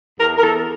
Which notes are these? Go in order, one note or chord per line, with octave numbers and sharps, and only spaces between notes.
E2 A#4
A#4
E2 A4